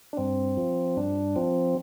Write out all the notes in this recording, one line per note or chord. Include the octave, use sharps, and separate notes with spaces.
D4
G2 C4
F3
G2 D4
F3 C4